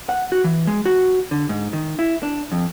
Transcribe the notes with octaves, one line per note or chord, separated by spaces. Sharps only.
F#5
F#4
E3
G#3
F#4
D3
G#2
D#3
E4
D4
F2